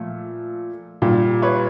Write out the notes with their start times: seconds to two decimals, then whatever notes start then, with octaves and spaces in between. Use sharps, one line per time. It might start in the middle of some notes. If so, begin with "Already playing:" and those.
Already playing: A#2 F3 A3
1.02 A#2 G3 G4
1.42 B4 C#5